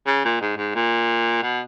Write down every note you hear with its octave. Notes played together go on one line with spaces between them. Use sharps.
C#3
A#2
G#2
G#2
A#2
B2